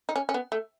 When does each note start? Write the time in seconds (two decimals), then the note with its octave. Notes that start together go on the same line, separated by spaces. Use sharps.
0.09 D#4
0.16 C#4
0.29 C#4
0.34 B3
0.52 A3